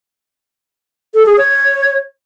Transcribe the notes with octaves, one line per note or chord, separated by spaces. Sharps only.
A4
G#4
C#5